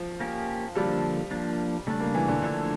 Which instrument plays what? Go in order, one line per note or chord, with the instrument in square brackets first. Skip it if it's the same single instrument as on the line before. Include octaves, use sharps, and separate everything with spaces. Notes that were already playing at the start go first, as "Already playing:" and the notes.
Already playing: [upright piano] F3
[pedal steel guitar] A#3 C#4 G4
[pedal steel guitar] D3 F3 A#3 D4 A4 [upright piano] G3
[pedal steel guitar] F3 A#3 D4
[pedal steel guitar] C#3 G3 D4 [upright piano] A3
[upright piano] A#3
E3
D3
[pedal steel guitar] F3 A3 D4 A4 C#5